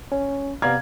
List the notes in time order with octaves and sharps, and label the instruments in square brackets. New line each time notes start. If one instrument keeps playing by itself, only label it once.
[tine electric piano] C#4 [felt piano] C#5
[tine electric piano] C3 B3 F6 [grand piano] D5 F5 A#5 [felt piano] G#6